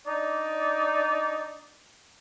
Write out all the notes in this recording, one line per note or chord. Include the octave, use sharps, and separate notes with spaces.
D4 D#4 D5